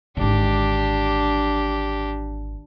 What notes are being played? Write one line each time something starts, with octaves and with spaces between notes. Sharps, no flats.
G#1 D3 D4 G4